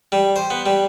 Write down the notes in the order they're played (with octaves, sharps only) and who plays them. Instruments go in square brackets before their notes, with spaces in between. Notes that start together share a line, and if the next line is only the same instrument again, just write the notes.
[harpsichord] G3
C5
B3
G3